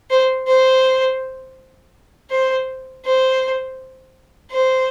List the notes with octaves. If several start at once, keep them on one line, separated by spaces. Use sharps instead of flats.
C5
C5
C5
C5
C5